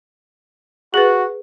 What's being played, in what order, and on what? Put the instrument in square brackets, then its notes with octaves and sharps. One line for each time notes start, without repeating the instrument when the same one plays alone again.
[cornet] F#4 [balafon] G#4 B4